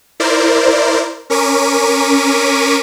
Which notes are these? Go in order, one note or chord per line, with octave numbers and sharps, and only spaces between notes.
E4 A#4 C5 D5
C#4 A#4 C#6 D6 B6 D#7